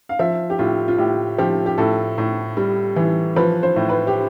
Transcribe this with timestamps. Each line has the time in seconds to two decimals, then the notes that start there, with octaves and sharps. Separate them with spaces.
0.09 F5
0.19 F3 E5
0.50 G4
0.59 A2 F4
0.88 F4
0.98 A2 G4
1.38 F3 G4
1.66 G4
1.78 A2 A4
2.18 A2
2.57 G3
2.96 E3
3.36 F3 B4
3.63 C5
3.76 A2
3.89 B4
4.07 G4